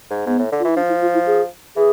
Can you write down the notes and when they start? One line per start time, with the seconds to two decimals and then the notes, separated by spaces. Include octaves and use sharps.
0.10 G#2
0.26 G#2 B3
0.39 A2
0.52 D3
0.60 F4
0.64 E3 E4
0.76 F3 D4
0.89 E4
1.02 F4
1.14 E4
1.27 G#4
1.76 E3 G#4